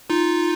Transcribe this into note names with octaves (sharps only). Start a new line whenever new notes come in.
D#4 F4